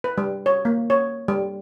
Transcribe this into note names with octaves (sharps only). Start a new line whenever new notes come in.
B4
G3
C#5
A#3
C#5
G3